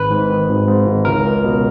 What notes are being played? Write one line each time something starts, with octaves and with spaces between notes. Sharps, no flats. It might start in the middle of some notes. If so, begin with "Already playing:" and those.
Already playing: G#1 B4
G#2
D#3
G#1
G#2
G#1
C#2 A#4
C#2
B2